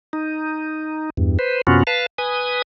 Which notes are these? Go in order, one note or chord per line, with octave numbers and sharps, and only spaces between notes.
D#4
E2 G2
B4 C5
F#2 C3 B3 C#4 F4 F#4
B4 F5 A5
B4 G#5 D#6